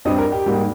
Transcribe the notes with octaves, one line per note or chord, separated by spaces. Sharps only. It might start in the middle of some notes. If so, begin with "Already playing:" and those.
G2 G3 C4 D#5
A#4
G4
G#2 G3 A#3